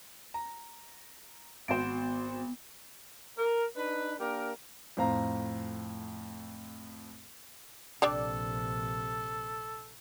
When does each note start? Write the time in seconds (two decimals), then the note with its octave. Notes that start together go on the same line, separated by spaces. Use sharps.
0.34 A#5
1.68 G#1 B3 F#4 C5
3.37 A#4
3.76 D4 D#4 B4
4.19 A#3 D4 G4 A#4
4.97 F2 A2 C5 F5 A#5
8.02 A#1 C3 G3 D4 A4 D5